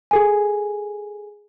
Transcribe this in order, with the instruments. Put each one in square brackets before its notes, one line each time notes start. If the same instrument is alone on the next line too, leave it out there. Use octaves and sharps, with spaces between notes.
[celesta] G#4 A4 G#5